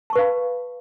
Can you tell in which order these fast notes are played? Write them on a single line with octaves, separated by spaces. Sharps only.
A5 C#6 B4 F5 B5